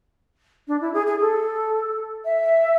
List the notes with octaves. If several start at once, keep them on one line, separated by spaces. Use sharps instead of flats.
D4
E4
G#4
G#4
A4
E5